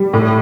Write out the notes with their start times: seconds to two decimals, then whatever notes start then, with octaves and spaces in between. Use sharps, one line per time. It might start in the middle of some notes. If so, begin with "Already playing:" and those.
Already playing: G3
0.13 A2